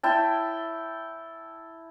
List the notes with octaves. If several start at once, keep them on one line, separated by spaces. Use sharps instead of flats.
E4 G5 A5